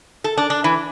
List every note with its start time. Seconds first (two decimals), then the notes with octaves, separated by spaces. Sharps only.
0.24 A4
0.37 D4
0.50 D4
0.64 E3